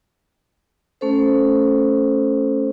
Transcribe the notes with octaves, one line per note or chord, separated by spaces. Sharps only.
A3 C#4 A4 C5